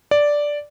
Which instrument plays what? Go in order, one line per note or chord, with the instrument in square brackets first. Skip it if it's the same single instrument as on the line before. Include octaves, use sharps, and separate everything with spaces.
[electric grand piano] D5